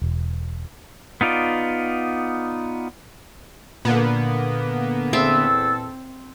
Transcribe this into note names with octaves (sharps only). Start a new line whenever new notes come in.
E1
B3 D#4 F4 D5
A#2 D3 A#3 B3
E2 C4 A4 E5